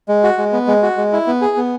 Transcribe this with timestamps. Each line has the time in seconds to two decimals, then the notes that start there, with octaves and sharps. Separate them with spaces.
0.09 G#3
0.23 F#4
0.38 G#3
0.52 B3
0.67 G#3
0.83 F#4
0.97 G#3
1.12 E4
1.27 B3
1.41 G#4
1.57 B3